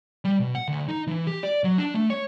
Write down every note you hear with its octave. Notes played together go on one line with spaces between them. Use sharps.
G3
B2
F#5
D2
D#4
E3
G4
D5
F#3
D4
A3
C#5